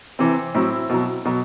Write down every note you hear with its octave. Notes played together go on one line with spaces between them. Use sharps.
C3 E3 C4
A2 F#3 C4 E4
B2 F#3
B2 F#3